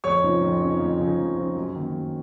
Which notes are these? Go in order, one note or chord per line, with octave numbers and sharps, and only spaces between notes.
F2 C#5 C#6
C#3 F3 C4 D#4
F2
C#3 F3 C4 D#4
F2
C#3 F3 C4 D#4
F2
C#3 F3 C4 D#4
F#2
D#3 A#3
F#2